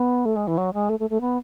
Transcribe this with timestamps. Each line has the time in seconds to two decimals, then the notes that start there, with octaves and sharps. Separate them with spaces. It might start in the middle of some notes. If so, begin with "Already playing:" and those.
Already playing: B3
0.25 A3
0.36 G#3
0.47 E3
0.58 F#3
0.74 G#3
0.89 A3
1.00 A3
1.10 A3
1.21 B3